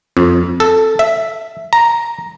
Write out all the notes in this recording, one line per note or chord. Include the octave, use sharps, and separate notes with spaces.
F2
A4
E5
A#5